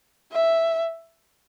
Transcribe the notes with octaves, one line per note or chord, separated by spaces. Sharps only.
E5